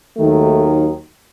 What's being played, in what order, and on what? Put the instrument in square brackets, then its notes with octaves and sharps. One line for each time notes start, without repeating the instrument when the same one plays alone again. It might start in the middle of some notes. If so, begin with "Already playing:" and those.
[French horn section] D#2 D#3 F#3 A3